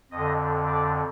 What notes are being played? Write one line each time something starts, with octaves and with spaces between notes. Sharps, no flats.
F2 D3 D#5
D5